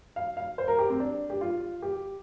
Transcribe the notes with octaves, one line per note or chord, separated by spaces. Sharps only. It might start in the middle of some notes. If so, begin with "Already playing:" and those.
F5
F5
C5
A#4
G4
C4
D4
G4
F4
G4